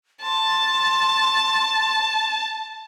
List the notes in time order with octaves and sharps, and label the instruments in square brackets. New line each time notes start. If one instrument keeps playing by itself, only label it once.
[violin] A5 [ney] C6